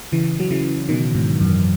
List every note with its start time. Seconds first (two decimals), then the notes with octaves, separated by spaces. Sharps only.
0.12 C#3 E3
0.40 F#3
0.51 C#3 E3
0.89 B2 D#3
1.15 G#2 B2
1.41 F#2